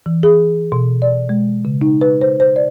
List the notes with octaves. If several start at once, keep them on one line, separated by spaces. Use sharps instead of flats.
E3
G#4
B2
D5
G#3
C#3
D#4
B4
C5
C5
D5